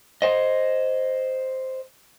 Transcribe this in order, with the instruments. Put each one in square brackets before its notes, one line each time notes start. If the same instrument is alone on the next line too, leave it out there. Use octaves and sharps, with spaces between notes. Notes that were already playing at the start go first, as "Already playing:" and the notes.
[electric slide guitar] C5 D#5